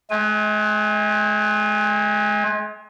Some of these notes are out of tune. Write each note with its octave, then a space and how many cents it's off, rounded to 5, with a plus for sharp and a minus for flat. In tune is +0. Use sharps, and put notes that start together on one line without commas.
G#3 +40 G#5 -30